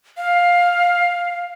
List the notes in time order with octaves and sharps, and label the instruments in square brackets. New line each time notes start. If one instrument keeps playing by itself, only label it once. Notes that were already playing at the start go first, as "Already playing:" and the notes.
[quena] F5